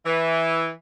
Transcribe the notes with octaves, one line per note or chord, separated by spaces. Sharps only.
E3